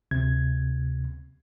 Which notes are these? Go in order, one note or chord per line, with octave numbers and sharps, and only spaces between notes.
D2 C3 G#6